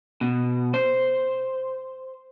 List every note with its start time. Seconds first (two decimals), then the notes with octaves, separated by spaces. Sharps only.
0.21 B2
0.74 C5